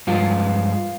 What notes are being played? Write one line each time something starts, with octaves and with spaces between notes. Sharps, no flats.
G2 F3 G#3 F4